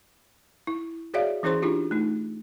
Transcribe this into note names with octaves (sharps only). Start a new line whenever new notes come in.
E4
F#4 G#4 C#5 D5 E5 F5
E3 C#4 E4 G#4 C5 C6
D4 E4 F4 G4
A3 D#4